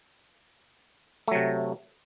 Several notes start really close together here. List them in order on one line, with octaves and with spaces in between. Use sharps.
A3 F#3 C3